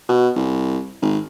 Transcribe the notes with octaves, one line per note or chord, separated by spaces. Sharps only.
B2
C2
G#1